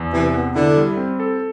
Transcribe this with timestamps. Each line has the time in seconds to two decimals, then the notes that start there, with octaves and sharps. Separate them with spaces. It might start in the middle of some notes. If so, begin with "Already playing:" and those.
Already playing: E2
0.13 C3 E3
0.34 B3
0.55 D3 E4
0.77 G3
0.97 C4
1.20 A4